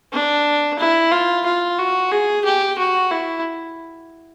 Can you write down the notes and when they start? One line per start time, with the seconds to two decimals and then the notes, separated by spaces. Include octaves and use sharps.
0.13 D4
0.79 E4
1.12 F4
1.45 F4
1.79 F#4
2.11 G#4
2.45 G4
2.78 F#4
3.11 E4